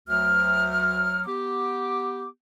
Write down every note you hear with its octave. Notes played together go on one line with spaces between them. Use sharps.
D2 F#3 F6
B3 G4 D6